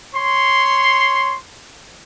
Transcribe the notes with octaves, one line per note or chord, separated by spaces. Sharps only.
C#5 C6